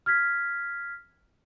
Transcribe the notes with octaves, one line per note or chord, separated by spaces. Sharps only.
F6 G#6 B6